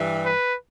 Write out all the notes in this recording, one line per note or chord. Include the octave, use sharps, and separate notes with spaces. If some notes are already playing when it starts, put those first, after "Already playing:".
Already playing: G2 E3 G3
B4